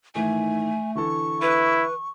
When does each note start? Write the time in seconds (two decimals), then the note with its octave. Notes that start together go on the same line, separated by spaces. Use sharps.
0.15 G#2 D#3 E3 A3 G#5
0.95 D3 E3 A4 C#6
1.42 E4 B4